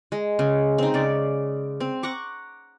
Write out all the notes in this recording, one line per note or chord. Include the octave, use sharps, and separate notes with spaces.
G#3
C#3
C4 D#4
C#3 D5
C4
F#5 A#5 C#6 D6